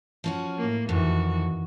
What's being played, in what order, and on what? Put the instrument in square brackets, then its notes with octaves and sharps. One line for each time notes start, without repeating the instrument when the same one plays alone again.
[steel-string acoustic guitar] F3 C#4 F#4
[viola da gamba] A2 A#3
[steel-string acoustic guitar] F2 [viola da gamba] D#3 E3 F#4